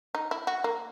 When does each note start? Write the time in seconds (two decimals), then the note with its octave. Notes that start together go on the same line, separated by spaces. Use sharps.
0.15 D#4
0.31 E4
0.47 F#4
0.64 A#3